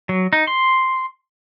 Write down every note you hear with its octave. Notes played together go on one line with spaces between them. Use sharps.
F#3
D#4
C6